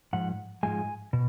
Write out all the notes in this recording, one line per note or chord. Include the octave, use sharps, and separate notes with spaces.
G#2 F3 F#5
G#2 F3 G#3 G#5
B2